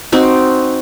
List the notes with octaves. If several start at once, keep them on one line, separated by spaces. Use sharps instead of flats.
C4 D#4 F#4